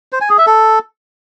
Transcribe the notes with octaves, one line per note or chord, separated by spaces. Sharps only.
C5
G#5
G#4
E5
A4